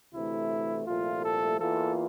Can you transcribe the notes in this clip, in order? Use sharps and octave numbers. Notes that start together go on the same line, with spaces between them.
D2 C3 E3 A3 E4
C2 A#2 F3 A3 F4
A4
E2 E3 A#3 F4 A4